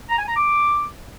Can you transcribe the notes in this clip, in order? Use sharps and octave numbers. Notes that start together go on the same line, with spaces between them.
A#5
G#5
A#5
D6